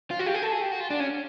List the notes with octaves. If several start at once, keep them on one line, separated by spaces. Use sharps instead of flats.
F4
F#4
G4
G#4
A4
G#4
G4
F#4
F4
D4
C#4